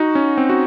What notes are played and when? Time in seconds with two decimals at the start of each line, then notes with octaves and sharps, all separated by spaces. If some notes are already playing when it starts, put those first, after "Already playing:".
Already playing: D#4 F#4
0.15 C#4
0.38 C4
0.49 F#4